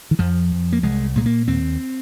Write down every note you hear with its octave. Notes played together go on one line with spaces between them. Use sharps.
D#3
F2 F3
F2
A#3
C2 G#3
A#2 G#3
A#3
D#2 C4